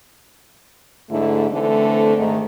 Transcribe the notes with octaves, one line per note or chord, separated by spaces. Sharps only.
G#2 D3 A3 E4
D3 E3 A3 C4
G#2 D#3 A3